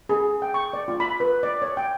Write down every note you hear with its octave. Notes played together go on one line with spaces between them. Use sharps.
G#4
G5
C#6
D5
F4
B5
B4
D5
C#5
G5